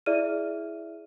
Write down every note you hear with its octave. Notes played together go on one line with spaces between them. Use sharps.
E4 G#4 D5 E5 F6 D#7